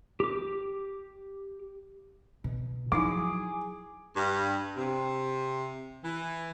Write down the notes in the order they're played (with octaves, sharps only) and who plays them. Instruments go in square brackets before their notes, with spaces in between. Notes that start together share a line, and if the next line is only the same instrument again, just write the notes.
[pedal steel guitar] G4 D6
[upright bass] B2
[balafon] F3 D#4 E4 [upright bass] F#3 [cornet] G#4 [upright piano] D6
[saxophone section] G2
C3
E3